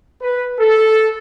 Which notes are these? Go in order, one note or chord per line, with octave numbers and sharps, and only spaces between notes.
B4
A4